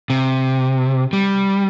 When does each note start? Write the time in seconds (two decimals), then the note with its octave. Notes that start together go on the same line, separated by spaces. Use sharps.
0.10 C3
1.13 G3